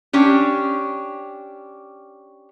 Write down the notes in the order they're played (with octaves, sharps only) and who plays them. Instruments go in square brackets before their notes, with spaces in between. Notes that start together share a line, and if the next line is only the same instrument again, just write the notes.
[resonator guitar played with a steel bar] C#4 D4 G4